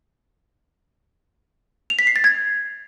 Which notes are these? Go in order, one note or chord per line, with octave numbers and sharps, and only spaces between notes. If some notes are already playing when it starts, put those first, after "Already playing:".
F7
B6
C7
A6
G#6